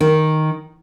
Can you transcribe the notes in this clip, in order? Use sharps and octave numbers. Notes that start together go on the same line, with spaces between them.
D#3